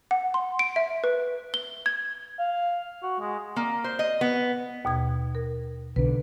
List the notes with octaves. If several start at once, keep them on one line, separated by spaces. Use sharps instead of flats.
F#5
C6
D7
E5
B4
G7
G#6
F5
F#4
G#3
A#3
C5
D#5
B3
D#2 B2 G#6
A#4
B1 D3 B4